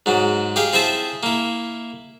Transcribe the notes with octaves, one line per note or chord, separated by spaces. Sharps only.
G#2 F#3
G4 G#4 F5
C4 E4 G#4 C5 E5 A5
A#3 E4